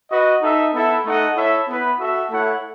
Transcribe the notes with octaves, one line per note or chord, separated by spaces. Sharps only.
F#4 B4 D#5
D#4 A4 E5
B3 E4 A4 E5
A3 D#4 A4 D#5 F#5
E4 A4 C#5 E5
B3 E4 B4
F#4 A4 E5
A3 E4 A4 C#5 F#5